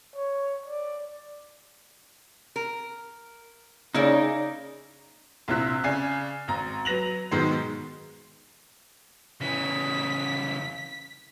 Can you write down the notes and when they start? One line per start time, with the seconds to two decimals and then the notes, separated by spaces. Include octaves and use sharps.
0.16 C#5
0.66 D5
2.56 A#4
3.95 C#3 A#3 D#4 E4 D5
5.48 A#1 C3 E4 F#6 B6
5.84 C#3 D5 G#5 C7
6.48 G#1 A#5
6.85 F#3 B4 A#6 F7 F#7
7.31 G#2 B2 D#3 F#3 G#3
9.41 C#3 E3 B6